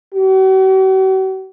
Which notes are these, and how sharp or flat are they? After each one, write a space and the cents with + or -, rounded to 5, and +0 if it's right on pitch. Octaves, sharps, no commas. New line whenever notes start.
F#4 +45